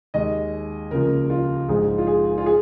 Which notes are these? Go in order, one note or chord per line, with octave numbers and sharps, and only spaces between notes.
D#2 D#3 G#3 D#5
C#2 C#3 F3 A#3 A#4
F4
A#1 G#2 G#3 G#4
F4
G#4
F4
G#4